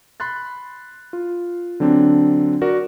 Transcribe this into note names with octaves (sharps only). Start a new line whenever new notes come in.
B5 C6 F#6 A6
F4
D3 F#3 C4 D4
F#4 A#4 D5